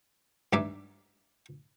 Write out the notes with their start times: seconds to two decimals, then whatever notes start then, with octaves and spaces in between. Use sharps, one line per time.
0.53 G2 D#4 D5 E5 G#5 D6